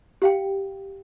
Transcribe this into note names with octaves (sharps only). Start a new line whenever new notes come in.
G4 F5 G5